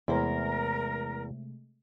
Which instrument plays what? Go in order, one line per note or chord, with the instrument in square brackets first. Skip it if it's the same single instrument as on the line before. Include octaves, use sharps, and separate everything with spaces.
[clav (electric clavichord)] E2 [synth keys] C3 G#3 A3 [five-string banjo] E4 C5 [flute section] A#4